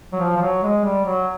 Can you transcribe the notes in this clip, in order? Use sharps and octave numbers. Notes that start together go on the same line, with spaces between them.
F#3
F3
F3
F#3
G#3
G3
F#3